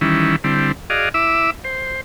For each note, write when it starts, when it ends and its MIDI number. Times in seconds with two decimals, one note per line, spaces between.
0.01 0.36 51
0.01 0.36 52
0.01 0.36 55
0.01 0.36 61
0.01 0.36 64
0.44 0.72 50
0.44 0.72 55
0.44 0.72 60
0.44 0.72 64
0.90 1.09 66
0.90 1.09 68
0.90 1.09 74
0.90 1.09 75
0.90 1.09 77
1.14 1.51 64
1.14 1.51 76
1.14 1.51 86
1.14 1.51 88
1.64 2.01 72